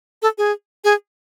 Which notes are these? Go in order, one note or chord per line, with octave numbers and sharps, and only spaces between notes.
A4
G#4
G#4